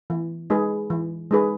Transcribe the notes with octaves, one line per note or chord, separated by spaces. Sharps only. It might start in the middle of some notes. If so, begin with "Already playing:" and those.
E3
G#3 D#4 G#4 B4
E3
G#3 D#4 G#4 B4